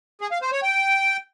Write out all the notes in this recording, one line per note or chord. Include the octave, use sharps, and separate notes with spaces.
G#4
F5
C5
C#5
G5